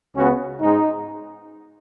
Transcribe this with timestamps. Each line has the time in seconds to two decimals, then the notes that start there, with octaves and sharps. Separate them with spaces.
0.15 C#2 C#3 B3 C#4 F#4
0.61 G#2 G#3 D#4